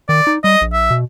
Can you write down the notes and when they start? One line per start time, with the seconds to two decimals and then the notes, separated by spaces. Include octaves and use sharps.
0.09 D#3 D5
0.27 D#4
0.44 G3 D#5
0.61 A#1
0.73 E5
0.91 B2